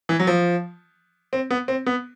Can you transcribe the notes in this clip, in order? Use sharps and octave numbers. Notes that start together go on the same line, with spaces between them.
E3
F#3
F3
C4
B3
C4
B3